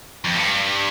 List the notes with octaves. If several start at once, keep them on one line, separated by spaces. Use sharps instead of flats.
F2
G2